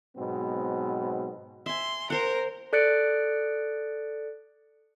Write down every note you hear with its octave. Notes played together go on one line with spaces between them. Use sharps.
G#2 B2 F#3 B3 C4
E5 G#5 C6
A#4 C5 F#5
A4 D5 F#6 A6 C#7 D7